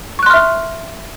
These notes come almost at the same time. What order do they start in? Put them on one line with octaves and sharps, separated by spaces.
C#6 F#6 C6 F6 E5